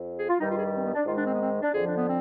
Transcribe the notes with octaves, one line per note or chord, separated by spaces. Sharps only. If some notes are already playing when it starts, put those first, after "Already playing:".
Already playing: F2
G#4
F4
G2 D#3 G3 D#4
F4
G#4
G4
C4
B3
D4
G#2 D#3 G#3 F4
D4
C4
B3
C4
D4
F2 D3 F3 G#4
D4
B3
C4